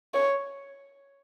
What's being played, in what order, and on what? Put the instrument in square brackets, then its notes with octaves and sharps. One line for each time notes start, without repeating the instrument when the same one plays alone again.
[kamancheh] C#5